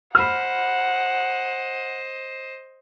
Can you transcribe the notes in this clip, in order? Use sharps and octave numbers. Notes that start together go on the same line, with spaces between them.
C5 D#5 F#5 B5 F6